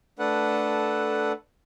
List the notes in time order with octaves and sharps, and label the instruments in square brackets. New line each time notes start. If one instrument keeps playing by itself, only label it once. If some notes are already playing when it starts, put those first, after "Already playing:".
[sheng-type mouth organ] A3 D4 A4 B4 F#5